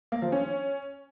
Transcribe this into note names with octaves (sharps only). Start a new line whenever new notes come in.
A#3
F3
C#4